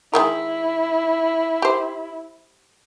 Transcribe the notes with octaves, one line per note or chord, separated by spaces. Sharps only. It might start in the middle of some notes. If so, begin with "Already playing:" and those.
D#3 G#3 E4 A#4
G4 C5